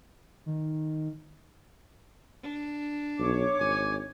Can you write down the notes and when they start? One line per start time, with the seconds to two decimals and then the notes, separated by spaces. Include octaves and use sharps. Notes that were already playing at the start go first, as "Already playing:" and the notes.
0.46 D#3
2.43 D4
3.19 B1 C#5 D6
3.60 G#1 G#5